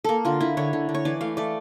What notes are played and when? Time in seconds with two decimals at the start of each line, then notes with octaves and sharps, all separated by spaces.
0.04 A#3 A4 A#4
0.25 D3 F4
0.41 D3 E4
0.57 D3 C#5
0.73 D3
0.89 D3
0.94 C#5
1.05 E3 D5
1.21 A3 F5
1.37 A3 D5